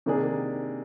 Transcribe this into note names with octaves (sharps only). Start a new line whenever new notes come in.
C3 D#3 A#3 D4 G#4